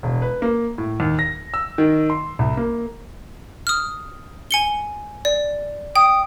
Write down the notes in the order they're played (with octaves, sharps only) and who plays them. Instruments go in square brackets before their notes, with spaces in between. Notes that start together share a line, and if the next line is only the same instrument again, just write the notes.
[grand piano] E1
B4
A#3
A2
D#2
A#6
E6
D#3
C6
C2
A#3
[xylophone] D#6 F6
G#5 C#7 G7
D5
[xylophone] G5 [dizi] D#6